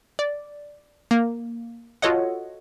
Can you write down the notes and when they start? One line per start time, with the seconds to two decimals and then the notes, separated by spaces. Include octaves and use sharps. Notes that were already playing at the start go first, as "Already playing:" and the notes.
0.19 D5
1.11 A#3
2.02 F4 F#4 A4 C#5 D#5 F#5